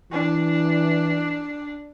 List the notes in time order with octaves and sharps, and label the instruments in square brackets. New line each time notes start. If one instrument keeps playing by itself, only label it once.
[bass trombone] E3 [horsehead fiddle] D4